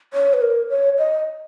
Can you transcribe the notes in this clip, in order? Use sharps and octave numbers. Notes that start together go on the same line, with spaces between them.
C#5
B4
A#4
C#5
D#5